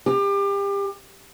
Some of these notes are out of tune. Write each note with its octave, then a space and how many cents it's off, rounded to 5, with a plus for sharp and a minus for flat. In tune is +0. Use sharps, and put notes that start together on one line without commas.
G4 +30